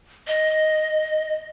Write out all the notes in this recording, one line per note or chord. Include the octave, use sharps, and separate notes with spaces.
D#5